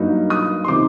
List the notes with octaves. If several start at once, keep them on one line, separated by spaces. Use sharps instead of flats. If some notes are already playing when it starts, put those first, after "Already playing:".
Already playing: G2 F#3 A#3 D#4
D#6
C6
C3 D#3 F#3 C4 D#4 D6